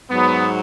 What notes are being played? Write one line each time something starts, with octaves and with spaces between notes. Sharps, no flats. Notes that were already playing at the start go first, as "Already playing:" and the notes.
G#2 F#3 B3